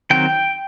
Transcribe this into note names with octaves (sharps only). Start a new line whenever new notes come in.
D#3 F#3 C4 G5